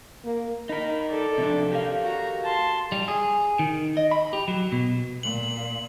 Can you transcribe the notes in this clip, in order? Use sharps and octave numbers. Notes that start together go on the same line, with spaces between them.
A#3
D#4 A#4 B5
A4 D5
C3 F3 D4
G4 A#4 F5
F#4 A#5
A5 C6
G3
G#4
D#3
D#5
B5
G4
F#3
B2
A#2 F#7